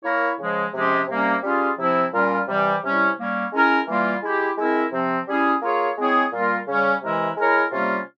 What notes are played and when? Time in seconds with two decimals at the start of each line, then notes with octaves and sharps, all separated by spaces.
0.04 A#3 E4 A#4 C#5
0.39 C#3 F3 G#3
0.74 C3 F3 G#3 C#4 G4
1.09 C3 G3 A#3 C#4
1.44 G3 C#4 F4 G#4
1.79 C3 F3 C4 E4
2.14 A#2 G3 C#4 F4 A#4
2.48 C3 E3 G3
2.84 C3 G3 C#4 E4
3.18 G3 A#3 C#4
3.53 G#3 C#4 E4 A#4
3.88 E3 G3 A#3 F4
4.23 G#3 E4 G4
4.58 G#3 C4 E4 A#4
4.93 C3 F3 C4
5.28 G3 C#4 E4 G#4
5.62 A#3 F4 G#4 C#5
5.98 G#3 C4 E4 G#4 C#5
6.33 A#2 G3 A#3 F4 A#4
6.68 C#3 G3 C#4
7.03 C3 E3 G#3 E4 A#4
7.37 G#3 E4 A#4 C#5
7.72 C3 G3 A#3 C#4 F4